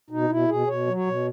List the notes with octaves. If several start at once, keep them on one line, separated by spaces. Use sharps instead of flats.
B2 D#4
B2 E4
B2 G#4
B2 C#5
F#3
C#5
B2